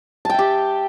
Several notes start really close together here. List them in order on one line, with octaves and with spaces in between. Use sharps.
A5 G5 E5 G4